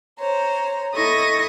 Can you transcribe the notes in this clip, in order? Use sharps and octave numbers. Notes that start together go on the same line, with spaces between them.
C5 C#5 A#5
E4 A4 D#5 C#6 D#6 A#6